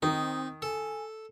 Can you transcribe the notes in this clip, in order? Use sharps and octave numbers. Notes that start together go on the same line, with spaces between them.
D#3 C4 D#4
A4 G#5